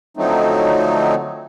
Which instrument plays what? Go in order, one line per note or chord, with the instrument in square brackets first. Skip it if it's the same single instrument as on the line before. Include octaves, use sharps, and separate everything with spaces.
[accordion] D3 F3 F#3 A3 C4 D#4